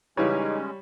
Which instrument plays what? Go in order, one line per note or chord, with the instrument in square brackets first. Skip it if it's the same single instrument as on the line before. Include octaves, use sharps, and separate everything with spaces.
[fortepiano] C#3 E3 [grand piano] G3 C#5 [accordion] G#3 C#4 [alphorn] D#4